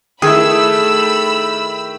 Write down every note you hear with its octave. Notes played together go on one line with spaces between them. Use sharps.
D#3 A3 E4 G#4 A4 B5 E6